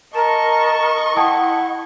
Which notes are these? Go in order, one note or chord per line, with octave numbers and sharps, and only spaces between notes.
A#4 D#5 A5 C#6
E4 F#5 G5 A5 D#6